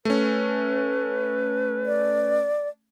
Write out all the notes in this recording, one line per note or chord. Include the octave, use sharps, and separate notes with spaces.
A3 C#4 B4
D5